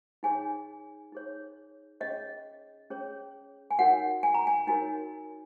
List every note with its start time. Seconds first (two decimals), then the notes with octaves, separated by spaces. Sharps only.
0.23 D#4 G#4 C#5 G#5
1.12 D#4 G#4 C#5
2.01 C#4 G#4 C#5 D#5
2.91 C#4 G#4 C#5
3.71 G#5
3.79 D#4 F#4 A#4 C#5 F#5
4.23 G#5
4.34 A#5
4.47 G#5
4.67 D#4 F#4 A#4 C#5 G#5